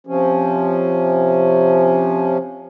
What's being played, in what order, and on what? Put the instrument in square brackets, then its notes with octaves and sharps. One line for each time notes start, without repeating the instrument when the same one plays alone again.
[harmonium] C3 F3 C#4